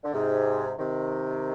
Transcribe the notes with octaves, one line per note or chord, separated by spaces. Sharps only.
D3
G#2 C3
C3 D#3